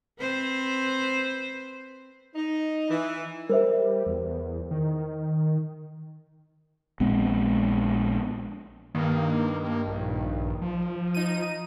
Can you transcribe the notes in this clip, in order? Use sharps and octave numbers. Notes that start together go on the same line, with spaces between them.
C4 B4 C5
D#4
E3
G3 A#4 C5 E5
E2
D#3
A#1 G#3 B3 C4
G2 D#3 A#3
A#3
A#1
F3
D#4 D#7